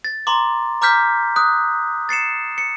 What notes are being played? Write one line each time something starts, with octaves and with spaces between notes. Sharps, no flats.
A6
A#5 C6 D6
A#5 D6 F6 G6 B6
D#6 F#6
A6 C7 C#7 E7
C#7